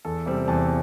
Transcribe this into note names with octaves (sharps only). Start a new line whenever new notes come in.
E2 A4
C3 G3 C4 G5
E2 A5